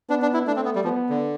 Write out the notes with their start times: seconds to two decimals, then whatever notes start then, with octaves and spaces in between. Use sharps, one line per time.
0.09 B3 D4
0.22 D4
0.34 E4
0.46 A3 D4
0.56 C4
0.65 B3
0.75 G3
0.84 F3 B3
1.09 D3